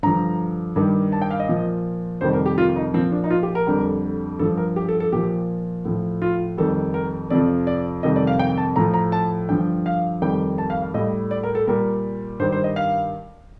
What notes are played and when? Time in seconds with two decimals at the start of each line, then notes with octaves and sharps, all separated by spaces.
0.03 G2 D3 F3 A#5
0.76 G2 D#3 G3
1.12 A5
1.22 G5
1.31 F5
1.40 D#5
1.49 A#2 F3
2.21 F2 C3 D#3 G3 C5
2.33 A#4
2.46 G4
2.58 F4
2.76 D#4
2.94 A#2 F3 C4
3.12 D4
3.24 D#4
3.30 F4
3.43 G4
3.55 A#4
3.67 F2 D3 G3
4.39 G2 F3 A4
4.57 A#4
4.76 G4
4.89 A4
5.00 A4
5.12 A#2 F3 G4
5.85 A2 F3
6.22 F4
6.58 F2 D#3 G3 A4
6.94 A#4
7.30 F2 C3 F3 D5
7.67 D5
8.03 F2 C3 D#3 G3 D#5
8.16 D5
8.27 F5
8.39 G5
8.57 A5
8.76 A2 F3 A#5
8.94 A#5
9.12 A5
9.49 G2 D3 F3 G5
9.86 F5
10.22 F2 D#3 G3 G5
10.58 A5
10.70 F5
10.82 F5
10.94 A2 G3 D#5
11.31 D5
11.43 A#4
11.55 A4
11.67 A#2 G3 A#4
12.39 G2 D#3 G3 C5
12.52 C5
12.64 D#5
12.76 F5